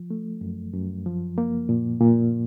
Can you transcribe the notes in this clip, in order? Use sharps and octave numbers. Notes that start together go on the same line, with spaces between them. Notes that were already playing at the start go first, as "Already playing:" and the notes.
Already playing: F3
A3
F#2
F#2
F3
A#3
A#2
A#2